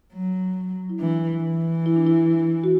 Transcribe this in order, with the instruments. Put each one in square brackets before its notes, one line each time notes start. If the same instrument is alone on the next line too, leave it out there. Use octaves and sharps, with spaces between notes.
[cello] F#3
[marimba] E4
[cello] E3 [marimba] D4
[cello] E3
[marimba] E4
D4
E4
F#4